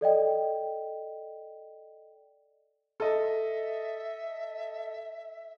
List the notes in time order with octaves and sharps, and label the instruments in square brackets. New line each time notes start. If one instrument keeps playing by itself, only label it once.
[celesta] A4 D5 D#5 G5
[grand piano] A4 D#5 [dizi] E5